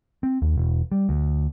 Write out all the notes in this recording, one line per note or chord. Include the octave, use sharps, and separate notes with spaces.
C4
D#2
E1
G3
D2